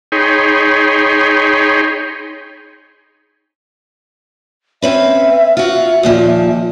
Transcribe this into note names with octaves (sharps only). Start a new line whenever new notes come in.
D#4 G#4 C#5 G5 B5 C6
C4 C#4 B4 E5
F4 F#4 E5
D#2 A#2 F3